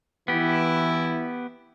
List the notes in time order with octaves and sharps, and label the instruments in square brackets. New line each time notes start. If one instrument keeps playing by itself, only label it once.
[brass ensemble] E3 E4 [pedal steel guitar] B3 G4